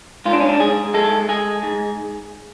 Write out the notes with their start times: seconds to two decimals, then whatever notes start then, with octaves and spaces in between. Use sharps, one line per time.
0.25 G#2 F4
0.33 D4
0.40 C#4
0.49 D4
0.60 G#2 G#4
0.94 G#3 A4
1.29 G#3 G#4
1.63 G#2